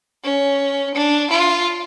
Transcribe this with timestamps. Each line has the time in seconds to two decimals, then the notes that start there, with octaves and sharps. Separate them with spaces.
0.24 C#4
0.95 D4
1.31 F4